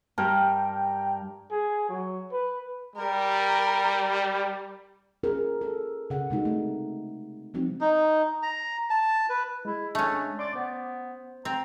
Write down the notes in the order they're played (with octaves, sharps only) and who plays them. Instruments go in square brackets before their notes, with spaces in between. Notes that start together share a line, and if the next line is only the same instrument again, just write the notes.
[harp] G2 [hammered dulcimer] A#4 [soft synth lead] G5
[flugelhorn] G#4
F#3
B4
[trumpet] G3 [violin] A#4
[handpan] C#4 F4 G#4 A#4
A4
C#3 F#5
C3 G#3 D#4 F#4
A3
F3 G3 C4 D#4 F#4
[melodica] D#4
A#5
A5
B4
[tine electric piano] G#3 [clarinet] E4
[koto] A3 C#4 [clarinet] D4
[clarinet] D5 [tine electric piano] C6 D6 A6
[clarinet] B3 [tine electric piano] C5
[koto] C4 [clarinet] A#5